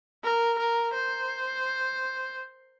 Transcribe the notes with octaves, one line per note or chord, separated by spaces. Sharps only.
A#4
A#4
C5